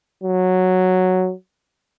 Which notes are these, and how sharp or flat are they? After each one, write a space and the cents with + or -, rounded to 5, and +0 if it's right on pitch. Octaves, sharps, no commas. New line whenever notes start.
F#3 -5